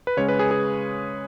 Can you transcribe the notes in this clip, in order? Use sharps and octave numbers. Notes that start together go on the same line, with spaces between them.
B4
C#3 G#3 C#4 C#5
B4
G#4
G#4